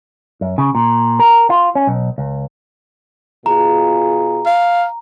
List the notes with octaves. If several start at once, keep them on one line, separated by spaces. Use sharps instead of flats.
F#2
C#3
A#2
A#4
F4
C#4
B1
C#2
B2 F4 G#4 A#5
F5